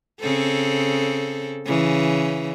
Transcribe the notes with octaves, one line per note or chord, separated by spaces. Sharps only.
C#3 C4 A4
C#3 E3